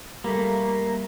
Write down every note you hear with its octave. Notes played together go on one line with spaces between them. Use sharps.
G3 A3 A#3